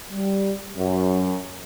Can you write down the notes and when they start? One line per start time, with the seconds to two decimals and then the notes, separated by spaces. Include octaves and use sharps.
0.11 G3
0.76 F#2